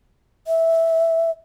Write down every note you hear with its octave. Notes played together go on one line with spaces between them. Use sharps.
E5